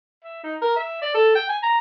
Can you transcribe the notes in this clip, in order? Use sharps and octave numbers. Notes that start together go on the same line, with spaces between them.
E5
D#4
A#4
E5
D5
A4
G5
G#5
A#5